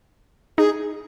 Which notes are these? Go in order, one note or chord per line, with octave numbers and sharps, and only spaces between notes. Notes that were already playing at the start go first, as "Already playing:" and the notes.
D#4 G#4